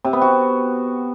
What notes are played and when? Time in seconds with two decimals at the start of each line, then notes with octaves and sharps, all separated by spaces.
0.04 C3
0.13 B3
0.21 F#4